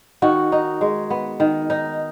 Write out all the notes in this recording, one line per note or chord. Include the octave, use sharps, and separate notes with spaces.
D#3 F#4
D#4
G#3
B3
D#3
D#4